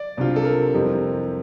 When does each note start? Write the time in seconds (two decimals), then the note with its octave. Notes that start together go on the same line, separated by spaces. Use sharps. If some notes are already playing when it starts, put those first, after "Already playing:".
Already playing: D5
0.17 C2 C3 G3 D4 F4
0.36 A4
0.45 A#4
0.74 F2 C3 G3 C4 E4